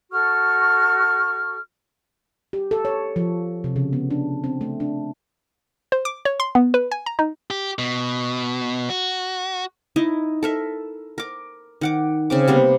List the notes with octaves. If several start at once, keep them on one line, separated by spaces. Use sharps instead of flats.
F#4 A4 C#6 F6
G4
A4
C#5
F3
C3
C#3
B3
D4
C4
A3
D4
C5
D6
C#5
C6
B3
B4
G#5
A#5
D#4
G4
B2
F#4
D#4 E4 D#5
A4 A#4 E5
A#4 D6
D#3 F#5 D6
C#3 C4 D6
C3 G3 A#3 B3